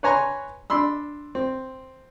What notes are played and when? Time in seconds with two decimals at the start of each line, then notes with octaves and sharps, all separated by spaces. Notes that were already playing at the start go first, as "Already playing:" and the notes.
0.03 B4 C#5 G#5 A#5 C6 C#6
0.70 D4 B5 C6 E6
1.35 C4